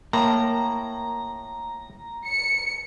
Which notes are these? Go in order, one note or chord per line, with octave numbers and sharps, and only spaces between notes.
A2 A#3 A#5
C#7